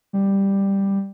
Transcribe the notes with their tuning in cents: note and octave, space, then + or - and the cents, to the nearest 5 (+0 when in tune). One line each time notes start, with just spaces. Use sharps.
G3 +5